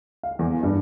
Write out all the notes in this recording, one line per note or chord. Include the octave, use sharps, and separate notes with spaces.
F5
E2
G2